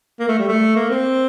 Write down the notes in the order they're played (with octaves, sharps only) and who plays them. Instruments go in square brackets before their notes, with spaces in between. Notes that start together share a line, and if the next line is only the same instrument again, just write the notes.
[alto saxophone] A#3
A3
G3
A3
A#3
C4